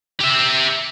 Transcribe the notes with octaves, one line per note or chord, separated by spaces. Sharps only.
G4 E5